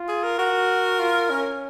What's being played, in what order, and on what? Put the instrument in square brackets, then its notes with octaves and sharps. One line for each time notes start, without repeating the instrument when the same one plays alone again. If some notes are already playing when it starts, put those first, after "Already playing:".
Already playing: [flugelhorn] F4
[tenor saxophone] G#4
A#4
[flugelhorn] F#4 [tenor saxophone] A#4
[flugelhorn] F4
C#4